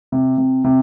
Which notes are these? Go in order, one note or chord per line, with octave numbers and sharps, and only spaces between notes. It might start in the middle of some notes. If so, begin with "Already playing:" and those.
C3
C3
C3